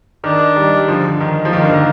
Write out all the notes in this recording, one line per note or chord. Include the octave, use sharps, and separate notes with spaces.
D#3 D4
D#3 G3
G3
D3 F3
D3
D#3
F3
D#3 A#3
D3
D#3